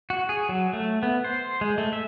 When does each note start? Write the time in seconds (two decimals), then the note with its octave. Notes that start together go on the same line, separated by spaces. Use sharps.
0.10 F#4
0.29 G#4
0.49 F#3
0.73 A3
1.03 B3
1.24 C5
1.61 G#3
1.78 A3
1.93 E5